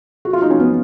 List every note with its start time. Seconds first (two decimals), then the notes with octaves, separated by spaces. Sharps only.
0.25 F#4
0.33 F4
0.42 D#4
0.51 C#4
0.60 B3